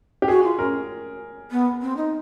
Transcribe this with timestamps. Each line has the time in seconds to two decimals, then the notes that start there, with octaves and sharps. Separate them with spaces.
0.22 G4
0.28 F#4 G#4
0.43 F4
0.59 C#4 A#4
1.50 B3
1.81 C4
1.96 D#4